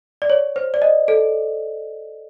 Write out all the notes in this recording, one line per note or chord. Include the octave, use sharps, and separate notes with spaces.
D5
C#5
C5
D5
D#5
A4